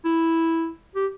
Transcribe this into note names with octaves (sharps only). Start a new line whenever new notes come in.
E4
G4